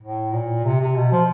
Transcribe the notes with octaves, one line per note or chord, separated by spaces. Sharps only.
A2
A#2
C3
C3
B2
F3